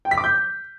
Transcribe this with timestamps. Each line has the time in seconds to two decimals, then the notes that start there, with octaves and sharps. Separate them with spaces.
0.05 G5
0.11 B6
0.18 D6
0.24 G6